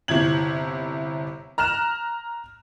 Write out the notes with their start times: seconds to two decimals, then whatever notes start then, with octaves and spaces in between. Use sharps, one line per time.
0.08 G1 C3 E4 G#6 F#7
1.58 A#5 F6 F#6 E7